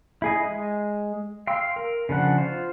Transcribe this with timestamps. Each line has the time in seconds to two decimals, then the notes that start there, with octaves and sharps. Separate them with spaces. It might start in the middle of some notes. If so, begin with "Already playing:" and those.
0.22 E4 G#4 D#5
0.44 G#3
1.47 F5 G5 C6 E6
1.76 A#4
2.09 C#3 F3 D4 F#5
2.38 F4 C5